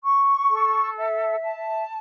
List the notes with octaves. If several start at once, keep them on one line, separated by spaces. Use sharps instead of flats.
C#6
A4
E5
A5